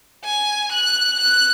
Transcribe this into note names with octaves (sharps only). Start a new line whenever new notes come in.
G#5
F#6
F#6